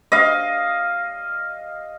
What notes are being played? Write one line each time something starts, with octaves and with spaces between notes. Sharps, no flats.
D#5 F5